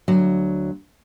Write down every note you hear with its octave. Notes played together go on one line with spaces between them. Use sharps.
D2 F#3